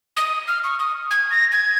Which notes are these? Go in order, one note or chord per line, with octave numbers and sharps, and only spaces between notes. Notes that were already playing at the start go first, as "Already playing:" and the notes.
D#6
F6
C#6
D#6
G#6
A#6
G#6